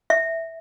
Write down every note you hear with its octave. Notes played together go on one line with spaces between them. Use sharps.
E5